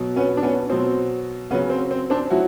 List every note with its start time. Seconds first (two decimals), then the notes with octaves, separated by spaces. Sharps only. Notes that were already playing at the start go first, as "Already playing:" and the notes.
Already playing: B2 F#3
0.16 B3 C#4
0.37 D4
0.43 B3 C#4
0.70 B2 F#3 C4
1.50 C#3 B3 C#4
1.54 F#3
1.70 C4
1.91 C4
2.10 C4 D4
2.30 F#3 E4 F#4